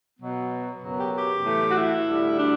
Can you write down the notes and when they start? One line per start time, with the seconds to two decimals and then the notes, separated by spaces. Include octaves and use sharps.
0.19 B2 F#3 B3
0.82 F#2 C#3 F#3 B3
0.98 G4
1.14 G4
1.45 A2 E3 A3
1.69 F#4
1.76 E4
2.07 D2 D3 G3
2.39 D4